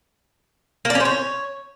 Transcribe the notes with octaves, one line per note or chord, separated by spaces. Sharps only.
A#3
D5
C#4
C5
C#5